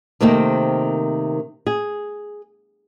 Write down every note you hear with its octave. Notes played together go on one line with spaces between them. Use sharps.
C3 D#3 A3 A#3 C4
G#4